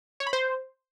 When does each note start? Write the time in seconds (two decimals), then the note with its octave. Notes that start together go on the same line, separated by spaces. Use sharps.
0.20 C#5
0.27 B5
0.33 C5